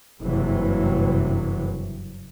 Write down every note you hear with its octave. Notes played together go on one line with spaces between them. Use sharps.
F#1 G2 C3 E3 F#3